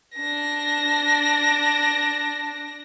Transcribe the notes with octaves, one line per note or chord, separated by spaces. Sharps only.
D4 A#6